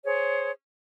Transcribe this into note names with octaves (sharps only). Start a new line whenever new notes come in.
G#4 C5 C#5